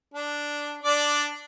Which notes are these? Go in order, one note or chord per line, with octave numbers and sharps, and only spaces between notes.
D4
D4 D5